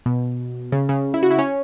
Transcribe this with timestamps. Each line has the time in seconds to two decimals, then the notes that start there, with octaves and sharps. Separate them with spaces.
0.06 B2
0.72 C#3
0.89 C#3
1.14 E4
1.23 F#4
1.31 E4
1.39 C#4